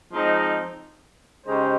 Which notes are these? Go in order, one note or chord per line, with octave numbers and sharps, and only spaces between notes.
F3 G#3 C4 D#4
C#3 G#3 D#4 G4 C5